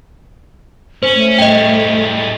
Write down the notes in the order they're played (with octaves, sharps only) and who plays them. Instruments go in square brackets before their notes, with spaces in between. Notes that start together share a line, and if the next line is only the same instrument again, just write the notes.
[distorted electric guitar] C#4 [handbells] C5
[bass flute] A3
[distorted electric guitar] A2 G3 [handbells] D#5 G5